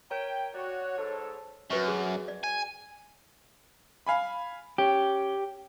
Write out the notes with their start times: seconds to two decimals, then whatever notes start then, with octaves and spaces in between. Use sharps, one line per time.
0.10 A#4 C#5 G5 A#5
0.54 F#4 C#5 D5
0.97 G#2 A4
1.71 F#2 F#4 B4 C#6
1.88 G#4
2.28 D5
2.44 G#5
4.07 F5 G#5 B5
4.78 C#4 G4